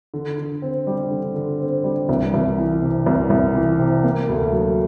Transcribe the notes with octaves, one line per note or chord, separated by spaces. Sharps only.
D3
D3
C4
G3
D3
D3
C4
G3
C2
C2
E3
C3
C2
C2
E3
C3
A#3
D2
F#3